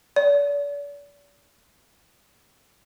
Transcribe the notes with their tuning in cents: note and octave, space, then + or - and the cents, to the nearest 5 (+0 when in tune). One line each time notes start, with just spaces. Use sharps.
D5 -40